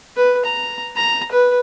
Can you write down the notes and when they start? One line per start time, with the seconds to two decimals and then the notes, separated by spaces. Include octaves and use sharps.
0.16 B4
0.45 A#5
0.96 A#5
1.32 B4